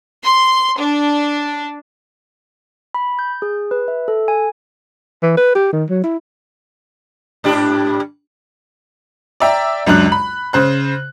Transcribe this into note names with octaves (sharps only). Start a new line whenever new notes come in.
C6
D4
B5
G6
G#4
B4
E5
A4
G#5
E3
B4
G4
D#3
F#3
E4
G#2 D4 G4
D5 E5 G5 A#5
C#2 F#2 D4 F#6 F#7
B5
C#3 C5 F#6